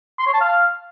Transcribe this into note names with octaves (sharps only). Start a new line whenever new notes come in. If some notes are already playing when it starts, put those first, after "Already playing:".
C6
C#5
A5
F5